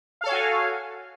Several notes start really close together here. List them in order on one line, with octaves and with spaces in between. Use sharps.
F5 A4 C#5 G#5 F#4